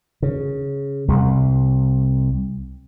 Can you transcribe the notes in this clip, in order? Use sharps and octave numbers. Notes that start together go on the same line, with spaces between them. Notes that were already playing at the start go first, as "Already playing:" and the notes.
C#3
C2